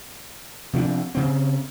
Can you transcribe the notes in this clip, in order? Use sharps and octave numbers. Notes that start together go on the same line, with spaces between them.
C3 F3 C4 D4
C#3 C4